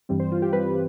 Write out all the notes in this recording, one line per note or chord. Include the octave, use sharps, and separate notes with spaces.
G2 E3 G3 C4
C5
F4
G4
G2 E3 G3 C4 B4